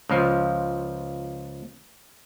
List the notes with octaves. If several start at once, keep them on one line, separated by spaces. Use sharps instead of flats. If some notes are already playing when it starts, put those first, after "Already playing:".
C#2 F3